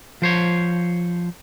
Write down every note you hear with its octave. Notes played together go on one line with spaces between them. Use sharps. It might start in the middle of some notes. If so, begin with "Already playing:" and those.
F3 C5 C#5